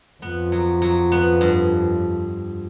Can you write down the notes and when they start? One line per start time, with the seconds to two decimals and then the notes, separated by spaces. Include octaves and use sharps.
0.22 F2 B3
0.52 F#3
0.82 F#3
1.12 B3
1.41 G2